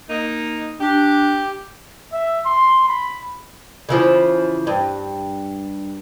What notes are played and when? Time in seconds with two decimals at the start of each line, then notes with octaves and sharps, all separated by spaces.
0.09 A#3 D#4
0.81 D4 G4
2.13 E5
2.46 C6
2.89 B5
3.89 C#3 E3 F3
4.67 G2